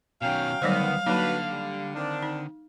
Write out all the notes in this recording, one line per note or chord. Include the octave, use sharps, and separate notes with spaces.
B2 D#3 F#3 C#4 F5 G5
D2 D#3 F#3 G3 B3 C5
D3 F#3 A#3 D4 D#4 F#4 B4
G3
D#3 C4 D4
D#4